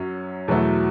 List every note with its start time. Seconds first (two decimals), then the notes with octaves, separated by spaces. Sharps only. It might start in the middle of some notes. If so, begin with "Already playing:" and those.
Already playing: F#2 F#3 C#4
0.48 E2 B2 F#3 A3 E4